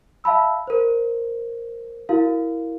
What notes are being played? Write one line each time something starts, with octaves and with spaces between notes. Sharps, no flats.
E5 F5 A5 B5 E6
A#4 C5
E4 F#4 A#4 F5